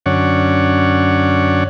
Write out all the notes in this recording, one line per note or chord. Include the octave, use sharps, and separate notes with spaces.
F#2 D3 C#4 C#5 D5 F#5